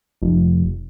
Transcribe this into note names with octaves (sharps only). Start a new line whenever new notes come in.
F1